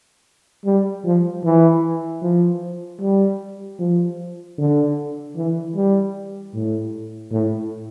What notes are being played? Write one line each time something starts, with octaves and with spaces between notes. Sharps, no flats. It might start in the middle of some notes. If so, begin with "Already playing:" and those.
G3
F3
E3
F3
G3
F3
D3
E3
G3
A2
A2